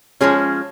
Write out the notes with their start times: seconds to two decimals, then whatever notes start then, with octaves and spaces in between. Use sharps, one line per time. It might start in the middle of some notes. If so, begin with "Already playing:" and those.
0.21 F3 G#3 C#4 G#4